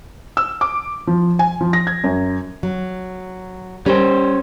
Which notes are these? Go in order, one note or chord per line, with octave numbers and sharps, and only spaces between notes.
E6
D6
F3
G#5
F3
A#6
G#6
F#2
F#3
G3 C#4 A#4 C5